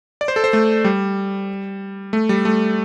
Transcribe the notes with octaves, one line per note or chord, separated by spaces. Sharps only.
D5
C5
A4
C5
A3
G3
A3
G3
A3